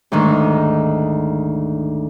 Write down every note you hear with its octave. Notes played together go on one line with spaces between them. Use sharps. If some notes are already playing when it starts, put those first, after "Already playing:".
D2 G#2 D#3